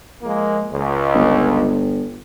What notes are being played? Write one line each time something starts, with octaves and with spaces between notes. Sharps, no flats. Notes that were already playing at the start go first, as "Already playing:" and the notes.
F3 G#3 A#3
C#2
G1